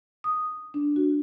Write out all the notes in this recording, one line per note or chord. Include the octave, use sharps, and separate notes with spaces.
D#6
D4
F#4